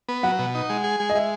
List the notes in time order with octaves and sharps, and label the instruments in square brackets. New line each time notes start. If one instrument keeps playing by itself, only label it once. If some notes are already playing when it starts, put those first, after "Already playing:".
[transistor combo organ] B3
[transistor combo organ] F#3 [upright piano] F#5
[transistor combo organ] B2
D#4
G#3
G#4
G#3
[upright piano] D#5
[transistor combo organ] G#3 [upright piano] E5